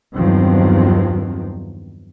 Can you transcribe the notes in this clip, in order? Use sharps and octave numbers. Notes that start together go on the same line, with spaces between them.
E2 G2 D#3 F3 F#3 C4